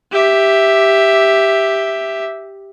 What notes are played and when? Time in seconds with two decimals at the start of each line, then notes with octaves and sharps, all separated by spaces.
0.12 G4 E5